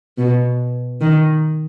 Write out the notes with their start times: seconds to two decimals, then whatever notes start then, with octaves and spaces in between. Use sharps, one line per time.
0.18 B2
1.01 D#3